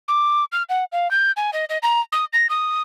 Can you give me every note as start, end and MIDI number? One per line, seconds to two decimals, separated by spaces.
0.08 0.44 86
0.52 0.63 89
0.69 0.84 78
0.92 1.10 77
1.11 1.32 91
1.37 1.50 80
1.53 1.65 75
1.70 1.78 75
1.83 2.01 82
2.12 2.25 87
2.33 2.47 94
2.50 2.82 87